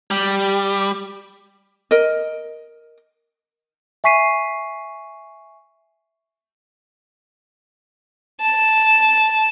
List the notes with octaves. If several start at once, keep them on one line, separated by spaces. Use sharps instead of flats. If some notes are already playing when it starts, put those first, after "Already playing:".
G3
A#4 D#5
E5 G#5 C#6 B6 C7 D#7
A5